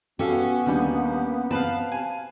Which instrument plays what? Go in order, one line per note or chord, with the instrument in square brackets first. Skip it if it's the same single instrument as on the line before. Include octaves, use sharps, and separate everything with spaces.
[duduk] B3 [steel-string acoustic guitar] C#4 [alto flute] F#4 [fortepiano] G4 A4 F5
[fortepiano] D#2 D3 G3 [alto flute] A#3
[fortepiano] C4 B4 [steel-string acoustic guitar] F5 A5
[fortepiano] G#5